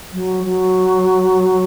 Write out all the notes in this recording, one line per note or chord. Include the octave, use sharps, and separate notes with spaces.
F#3
F#3